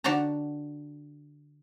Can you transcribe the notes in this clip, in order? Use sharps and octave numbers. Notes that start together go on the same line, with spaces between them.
D3 D4 F#4 G5 A5 A#5